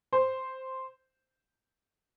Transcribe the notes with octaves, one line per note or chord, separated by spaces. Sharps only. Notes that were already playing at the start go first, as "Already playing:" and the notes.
C5